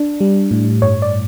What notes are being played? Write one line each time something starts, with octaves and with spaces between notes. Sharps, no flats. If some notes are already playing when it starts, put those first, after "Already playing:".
Already playing: D4
G3
A2
G2 C#5
D5